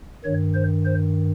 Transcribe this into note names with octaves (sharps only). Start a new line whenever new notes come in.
G2 D#3 C#5
C5
C5